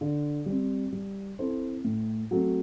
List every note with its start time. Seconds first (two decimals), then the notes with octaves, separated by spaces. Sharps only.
0.01 D3
0.46 G3 C4
0.92 G3
1.39 C4 E4 A4 C5
1.84 A2
2.31 F#3 A3 C4